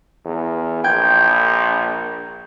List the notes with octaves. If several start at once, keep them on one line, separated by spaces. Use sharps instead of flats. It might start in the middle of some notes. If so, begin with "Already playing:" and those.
E2
A#1 G5 G6 G#6